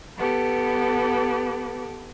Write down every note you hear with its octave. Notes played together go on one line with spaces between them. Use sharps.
B3 G4 A4 B4